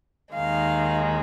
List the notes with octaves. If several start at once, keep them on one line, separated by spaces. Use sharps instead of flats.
D#2 D#3 G#3 F5